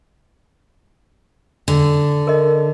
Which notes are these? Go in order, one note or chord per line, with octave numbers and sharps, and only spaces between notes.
D3
A#4 D#5